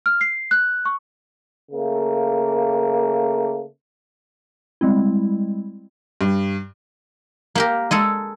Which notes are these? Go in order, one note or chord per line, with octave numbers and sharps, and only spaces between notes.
F6
C7
F#6
C#6
C#3 A3 A#3
G3 G#3 C4 E4
G2
A#3 G4 A#4
G#3 G#4 A4